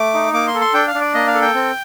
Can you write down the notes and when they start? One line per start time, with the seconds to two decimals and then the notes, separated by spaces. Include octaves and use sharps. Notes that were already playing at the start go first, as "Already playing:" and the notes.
Already playing: A3 D6
0.14 D#4
0.34 A#3 D6
0.47 C6
0.55 A4
0.61 C6
0.74 D4 G5
0.87 F5
0.95 D4
1.01 D5
1.14 A#3 D#5
1.27 F5
1.35 A4
1.42 G5
1.55 C4